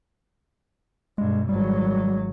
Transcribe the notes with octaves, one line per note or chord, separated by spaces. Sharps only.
G2 B2 G#3
G#1 F#3 G3